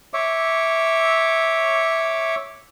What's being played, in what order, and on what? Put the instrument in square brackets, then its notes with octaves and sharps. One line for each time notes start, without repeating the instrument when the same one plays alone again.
[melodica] C#5 E5 D6